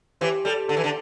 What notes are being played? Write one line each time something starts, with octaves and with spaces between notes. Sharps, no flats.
E3 G4 C5
G3 A4
D3 A4
E3
D3